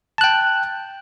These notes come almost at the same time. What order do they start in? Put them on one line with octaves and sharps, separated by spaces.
A5 F#6 G5